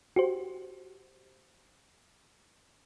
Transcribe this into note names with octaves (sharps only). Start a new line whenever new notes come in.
F#4 G4 C5